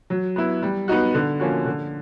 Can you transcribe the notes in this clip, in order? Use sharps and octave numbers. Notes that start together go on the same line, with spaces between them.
F#3
B3 E4
G3
B3 D#4 F#4
D3
F3 A#3 C#4 F#4
D3